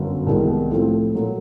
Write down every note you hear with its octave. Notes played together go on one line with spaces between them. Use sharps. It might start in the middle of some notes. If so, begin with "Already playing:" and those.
Already playing: G1 F#2 F#3 B3
C2 C3 D#3 G#3 B3
A2 F3 A3 C4
A#2 F#3 A3